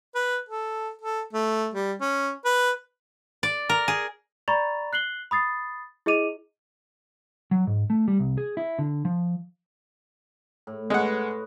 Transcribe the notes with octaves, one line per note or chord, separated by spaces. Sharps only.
B4
A4
A4
A3
G3
C#4
B4
D5
A#4
G#4
D5 A#5 B5 C#6 A6 F7
F#6 C7 F#7 G7
B5 D#6 A6 C7
E4 G#4 D#5 D6 D#7 F7
F#3
G#2
A3
G3
C2
G#4
E4
D3
F3
A2
G#3 C#4 B4 D#5 F#5